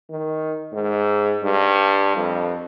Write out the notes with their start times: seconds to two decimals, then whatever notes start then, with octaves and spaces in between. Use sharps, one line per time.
0.10 D#3
0.73 G#2
1.44 G2
2.16 F2